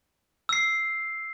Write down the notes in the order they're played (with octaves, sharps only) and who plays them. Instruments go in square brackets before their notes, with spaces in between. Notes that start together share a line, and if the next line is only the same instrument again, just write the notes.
[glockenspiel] E6 C7